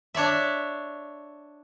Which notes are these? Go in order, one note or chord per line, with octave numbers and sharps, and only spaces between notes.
D4 C#5 D5 E5